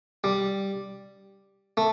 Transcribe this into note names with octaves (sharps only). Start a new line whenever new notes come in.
G3
A3